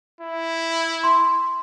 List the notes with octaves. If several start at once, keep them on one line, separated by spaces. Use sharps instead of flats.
E4
C6